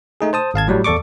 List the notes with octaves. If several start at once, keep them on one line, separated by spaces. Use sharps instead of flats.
A3 D#4 G#4
C5 A5 D#6
G#1 F5 A5 G#6
A2 F#3 G3
E2 A4 D5 C#6 D6